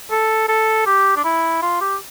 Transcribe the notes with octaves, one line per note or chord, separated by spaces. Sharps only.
A4
A4
G4
D4
E4
F4
G4